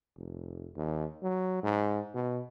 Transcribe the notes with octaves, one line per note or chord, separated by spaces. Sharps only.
F1
D#2
F#3
G#2
B2